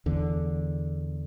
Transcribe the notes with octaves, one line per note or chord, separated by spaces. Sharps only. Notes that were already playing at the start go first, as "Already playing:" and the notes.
E2 D3